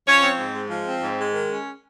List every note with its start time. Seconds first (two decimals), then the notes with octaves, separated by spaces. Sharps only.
0.07 F3 C#4 C#5
0.23 C4
0.39 G#2
0.54 G#3
0.70 F3
0.86 C4
1.02 G#2
1.18 G#3
1.34 D#3
1.49 C#4